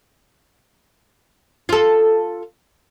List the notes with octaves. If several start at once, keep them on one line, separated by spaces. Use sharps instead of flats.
F4 A4